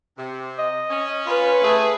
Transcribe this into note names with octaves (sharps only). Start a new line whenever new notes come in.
C3
D#5
C#4
F4 B4
A3 G#4